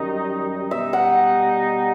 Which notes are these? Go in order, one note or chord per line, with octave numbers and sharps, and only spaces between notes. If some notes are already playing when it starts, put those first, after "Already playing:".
Already playing: F#2 D#3 G3 D#4 D#5
B2 G3 D#4 E5
F#5